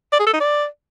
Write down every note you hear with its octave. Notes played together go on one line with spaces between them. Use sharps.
D5
G#4
A4
D#4
D5